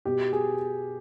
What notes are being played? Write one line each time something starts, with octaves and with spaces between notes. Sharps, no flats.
B2 G4
B2 G#4